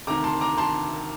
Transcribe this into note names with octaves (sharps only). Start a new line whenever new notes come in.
D2 C3 D#3 A#5 D6
A5 C6
A#5 D6
A5 C6